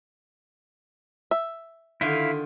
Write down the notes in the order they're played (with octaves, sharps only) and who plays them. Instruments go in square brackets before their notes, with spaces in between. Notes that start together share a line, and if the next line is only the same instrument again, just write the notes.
[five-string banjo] E5
[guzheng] D3 D#3 F4 [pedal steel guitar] E4 F5